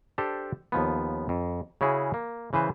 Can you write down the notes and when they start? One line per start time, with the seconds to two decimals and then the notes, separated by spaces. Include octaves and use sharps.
0.18 D4 G4 A4 C5
0.72 D#2 F3 B3
1.29 F2
1.81 C#3 C#4 E4 F#4 G#4
2.14 A#3
2.53 C#3 E3 B4 C5